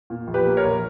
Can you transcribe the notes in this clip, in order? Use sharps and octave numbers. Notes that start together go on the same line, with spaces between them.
A#2
A#1
G4 B4
A#3
A#4 C#5
A#1